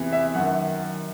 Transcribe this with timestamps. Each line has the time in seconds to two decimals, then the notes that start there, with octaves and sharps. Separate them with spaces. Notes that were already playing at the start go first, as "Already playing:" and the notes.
Already playing: E2 C3 E3
0.13 E5
0.35 F#2 D#3 F#5